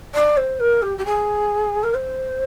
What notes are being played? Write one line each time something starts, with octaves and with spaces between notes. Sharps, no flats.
D5
C5
A#4
G4
G4
G#4
A#4
C5